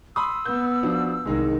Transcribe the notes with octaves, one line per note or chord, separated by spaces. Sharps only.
B5 C6 D#6 E6
B3 G6
F3 D4 F#4
C2 D#3 G#3 D#4 G#4